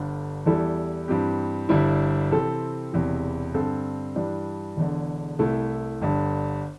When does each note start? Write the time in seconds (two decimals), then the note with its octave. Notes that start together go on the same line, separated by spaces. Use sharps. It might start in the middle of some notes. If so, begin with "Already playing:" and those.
Already playing: G1 G2 D3
0.46 E2 E3 G3 E4 A4
1.08 G2 E3 C4 G4
1.69 G1 G2 G3 E4
2.31 C3 E3 C4 A4
2.92 E1 E2 C3 E3
3.54 G2 D3 C4 A4
4.15 G2 E3 G3 D4
4.77 E1 E2 D3
5.39 C2 C3 A3 E4
6.01 G1 G2 D3